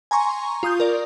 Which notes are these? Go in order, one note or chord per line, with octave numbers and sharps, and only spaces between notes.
G#5 A#5 C6 C#6
F4 D#6 G6
A#4 D5